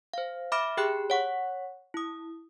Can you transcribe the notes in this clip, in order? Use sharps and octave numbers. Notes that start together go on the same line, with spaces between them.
C5 F5
E5 B5 D6 F6 A#6 D7
G4 G#4 G5 B5 F#6
C#5 F#5 C#6
E4 D#6